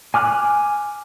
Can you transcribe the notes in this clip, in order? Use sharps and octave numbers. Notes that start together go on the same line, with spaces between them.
G#5 D6 F6 F#6